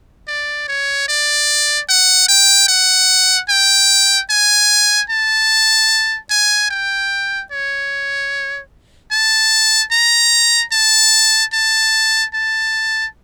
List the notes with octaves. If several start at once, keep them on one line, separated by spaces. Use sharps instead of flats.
D5
C#5
D5
F#5
G5
F#5
G5
G#5
A5
G#5
G5
C#5
A5
A#5
A5
A5
A5